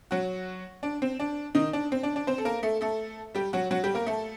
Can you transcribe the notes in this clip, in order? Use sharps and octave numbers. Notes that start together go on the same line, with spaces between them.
F#3 F#4
D4
C4
D4
D#3 D#4
D4
C4
D4
D4
C4 C5
A4
A#3 A#4
A3 A4
A3 A4
G3 G4
F#3 F#4
F#3 F#4
G3 G4
A#3 A#4
A3 A4